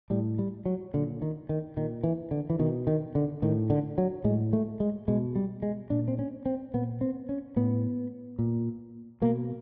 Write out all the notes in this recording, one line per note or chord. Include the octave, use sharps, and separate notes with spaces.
A2 G3
G3
F#3
A#2 D3
D#3
D#3
A#2 D#3
E3
D3
E3
B2 D#3
D#3
D3
A2 D#3
D3
F#3
A2 G#3
A3
G#3
B2 G#3
G3
G#3
A#2 D4
C4
C#4
C4
A#2 B3
C4
C#4
A2 B3
A#2
B2 A#3